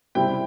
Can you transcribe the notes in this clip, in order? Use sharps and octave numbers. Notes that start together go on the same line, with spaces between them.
C3 G3 C4 E4 G5